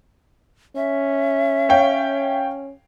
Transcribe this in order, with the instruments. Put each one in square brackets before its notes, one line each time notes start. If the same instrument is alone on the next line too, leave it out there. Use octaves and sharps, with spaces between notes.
[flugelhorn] C#4 [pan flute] E5
[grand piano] C#5 F5 G5